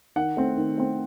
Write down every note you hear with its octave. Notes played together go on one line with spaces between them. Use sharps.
D#3 F#5
A3 C4
D#3
A3 C4